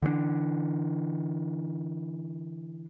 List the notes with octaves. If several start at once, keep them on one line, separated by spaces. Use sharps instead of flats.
D3 E3 G#3 D4